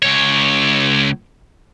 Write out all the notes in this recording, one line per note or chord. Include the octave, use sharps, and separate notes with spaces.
C#2 C#5